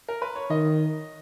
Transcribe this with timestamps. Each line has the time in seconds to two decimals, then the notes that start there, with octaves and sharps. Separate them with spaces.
0.08 A#4
0.22 B4
0.36 C#5
0.50 D#3 D#5